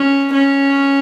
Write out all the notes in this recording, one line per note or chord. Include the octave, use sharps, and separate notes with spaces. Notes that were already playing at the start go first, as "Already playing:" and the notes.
Already playing: C#4
C#4